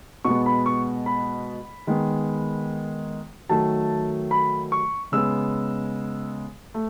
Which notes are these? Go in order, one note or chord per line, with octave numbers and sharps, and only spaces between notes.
B2 G#3 B3 C#6
B5
C#6
B5
D#3 G#3 B3
D#3 F#3 A3 A5
B5
C#6
C#3 G#3 B3 E6
A3